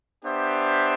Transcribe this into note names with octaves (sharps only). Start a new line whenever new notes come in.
B3 D4 G4 C5 E5